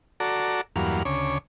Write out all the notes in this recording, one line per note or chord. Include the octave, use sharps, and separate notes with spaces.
F#4 A4 D5 A#5
E2 G2 F#3 A#3 F5
D2 C#3 C#5 D6